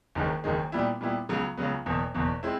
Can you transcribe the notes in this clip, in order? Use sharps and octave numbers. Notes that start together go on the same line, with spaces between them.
F#1 F#2 D#3 G#3
F#1 F#2 D#3 G#3
A#2 G3 B3 E4
A#2 G3 B3 E4
C#2 C#3 F#3 B3
C#2 C#3 F#3 B3
F#1 E2 B2
F#1 E2 B2
G#3 C4 E4